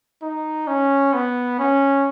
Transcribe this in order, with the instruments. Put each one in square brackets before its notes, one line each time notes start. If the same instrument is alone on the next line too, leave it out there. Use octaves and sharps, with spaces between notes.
[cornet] D#4
C#4
B3
C#4